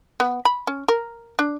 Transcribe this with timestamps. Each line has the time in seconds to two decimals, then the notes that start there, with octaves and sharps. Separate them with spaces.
0.20 B3
0.45 B5
0.67 C#4
0.88 A#4
1.39 D4